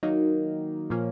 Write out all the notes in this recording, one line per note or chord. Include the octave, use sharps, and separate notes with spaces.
D#3 F#3 A#3 D#4
A#2 F3 A#3 C#4